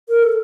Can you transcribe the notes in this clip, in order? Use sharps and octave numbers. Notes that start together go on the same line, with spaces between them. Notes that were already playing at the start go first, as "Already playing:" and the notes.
A#4
A4